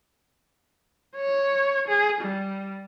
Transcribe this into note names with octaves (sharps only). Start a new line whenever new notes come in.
C#5
G#4
G3